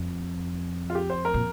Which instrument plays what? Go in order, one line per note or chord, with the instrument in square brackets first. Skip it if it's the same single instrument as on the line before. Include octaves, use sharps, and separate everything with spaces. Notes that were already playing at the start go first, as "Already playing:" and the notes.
Already playing: [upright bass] F2
[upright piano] F4
G4
C5
A#4
[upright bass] A#2